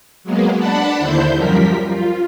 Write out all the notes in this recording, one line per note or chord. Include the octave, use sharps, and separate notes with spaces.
F#3 G#3 A#3 B3
D4 F#5 A5 B5
D#2 D3 E4 C5 G6
F#2 F3 G3 A#4 B6
F4